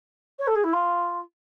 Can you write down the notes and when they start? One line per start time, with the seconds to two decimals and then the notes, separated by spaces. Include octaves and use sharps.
0.39 C#5
0.47 A4
0.55 G#4
0.64 E4
0.73 F4